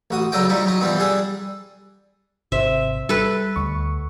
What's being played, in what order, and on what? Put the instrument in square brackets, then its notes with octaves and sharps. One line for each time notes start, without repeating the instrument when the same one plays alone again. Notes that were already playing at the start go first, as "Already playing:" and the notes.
[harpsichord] A1 F#4 D#6
C#2 F#3 D4 A4 D#5 G5
F3 G3 D#4 E4
F#3 D#4 D#5
E3 F3 G3 B3 C4
G3 D4 G#4 A4
[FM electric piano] G#1 C3 C5 [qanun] E5
[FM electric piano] G3 [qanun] A4 B4
[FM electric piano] D2 C#6